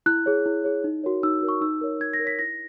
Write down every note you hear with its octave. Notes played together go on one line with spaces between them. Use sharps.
E4 F#6
G#4 C#5
E4
G#4 C#5
D#4
F#4 A#4 C#5
D#4 E6
F#4 A#4 C#5
C#6
D#4 E6
A#4 C#5
D#4 G#6
A#6
A#4
C#5 B6
E4 A#6